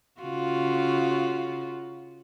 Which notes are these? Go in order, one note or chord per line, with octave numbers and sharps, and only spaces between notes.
C#3 F4 F#4